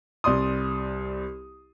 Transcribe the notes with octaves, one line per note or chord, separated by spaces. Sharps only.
C2 D5 C6 D#6